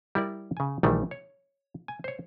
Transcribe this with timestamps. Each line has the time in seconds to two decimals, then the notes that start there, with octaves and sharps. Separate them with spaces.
0.15 G3 E4 A#4 D5
0.57 C#3 G#5
0.83 A#1 D#3 E3 G3 A3
1.11 C#5
1.88 G#5
2.04 C5 C#5